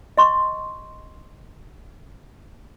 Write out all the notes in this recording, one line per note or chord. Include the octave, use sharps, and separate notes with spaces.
D#5 C6 C#6